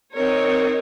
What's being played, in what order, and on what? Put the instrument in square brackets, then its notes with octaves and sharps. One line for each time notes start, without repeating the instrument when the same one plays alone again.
[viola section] C4 D#4 A#4 C#5